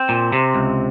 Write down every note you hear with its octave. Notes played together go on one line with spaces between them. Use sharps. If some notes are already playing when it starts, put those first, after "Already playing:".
Already playing: C4
A#2
C3
C#2